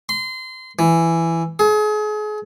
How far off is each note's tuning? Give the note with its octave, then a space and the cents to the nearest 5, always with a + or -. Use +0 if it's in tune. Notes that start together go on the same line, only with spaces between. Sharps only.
C6 -25
E3 +10
G#4 +35